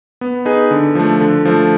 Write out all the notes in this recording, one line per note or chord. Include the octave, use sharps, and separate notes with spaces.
B3
D#4 G#4 B4
D3
F3 A3
D3
F3 A3